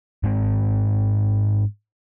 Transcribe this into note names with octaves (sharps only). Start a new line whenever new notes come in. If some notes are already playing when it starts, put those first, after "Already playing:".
G#2 G#3 C4